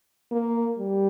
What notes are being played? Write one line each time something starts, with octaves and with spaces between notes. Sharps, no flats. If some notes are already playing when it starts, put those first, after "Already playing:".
A#3
G3